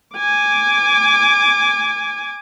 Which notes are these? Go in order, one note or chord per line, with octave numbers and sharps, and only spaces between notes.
G#5 D6